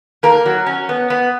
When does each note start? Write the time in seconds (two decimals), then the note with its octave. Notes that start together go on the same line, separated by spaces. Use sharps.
0.23 A#3 A#4
0.46 F#3
0.66 C#4
0.89 B3
1.10 B3